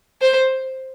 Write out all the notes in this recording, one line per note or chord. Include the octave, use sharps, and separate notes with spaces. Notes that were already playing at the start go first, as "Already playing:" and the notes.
C5